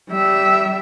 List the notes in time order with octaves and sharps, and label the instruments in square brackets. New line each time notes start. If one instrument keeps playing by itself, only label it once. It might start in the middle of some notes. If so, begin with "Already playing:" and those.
[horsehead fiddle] G3 E5